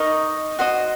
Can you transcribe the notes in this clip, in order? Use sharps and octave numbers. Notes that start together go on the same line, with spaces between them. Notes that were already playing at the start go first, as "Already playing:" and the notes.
Already playing: D#4 A#4 D#5 C#6
F#4 C5 D#5